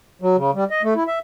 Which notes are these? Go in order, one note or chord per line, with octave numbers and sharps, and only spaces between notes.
F#3
C#3
G3
D#5
A3
E4
E5